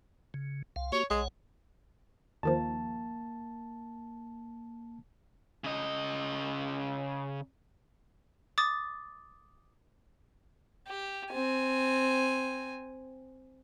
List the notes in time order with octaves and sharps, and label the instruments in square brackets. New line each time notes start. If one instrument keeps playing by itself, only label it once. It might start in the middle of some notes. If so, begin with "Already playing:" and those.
[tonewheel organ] C#3
C2 F5
[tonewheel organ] A#3 F#4 G4 [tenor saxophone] C#5
[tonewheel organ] B1 C#5 F#5 [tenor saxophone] G#3
[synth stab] D#2 D#3 F3 [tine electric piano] A#3 A5
[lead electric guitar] C#3 D#5
[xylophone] D6 D#6 A6
[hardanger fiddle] G4
C4 G#5